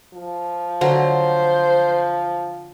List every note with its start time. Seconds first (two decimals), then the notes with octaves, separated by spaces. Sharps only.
0.14 F3
0.81 D3 F#3 C5